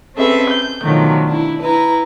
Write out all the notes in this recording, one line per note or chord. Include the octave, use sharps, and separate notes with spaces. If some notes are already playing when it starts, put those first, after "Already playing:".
C4 C#4 G#4 A4 B4 E5
G6
B2 D3 D#3 F3 F#3 A3
D4 E4
E4 B4 A#5